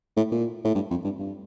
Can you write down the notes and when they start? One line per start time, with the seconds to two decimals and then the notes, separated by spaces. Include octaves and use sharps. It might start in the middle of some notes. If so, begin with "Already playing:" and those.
0.17 A2
0.31 A#2
0.65 A2
0.75 G2
0.91 F2
1.04 G2
1.19 G2